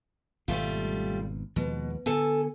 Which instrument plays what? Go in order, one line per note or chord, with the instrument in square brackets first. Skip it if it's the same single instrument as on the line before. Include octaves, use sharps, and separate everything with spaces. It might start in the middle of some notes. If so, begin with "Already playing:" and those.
[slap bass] G#1 B2 [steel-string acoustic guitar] G3 A3 F4
[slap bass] D#2 F3 G#3 [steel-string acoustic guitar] B2
[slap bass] D3 B3 [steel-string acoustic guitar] A4 G#5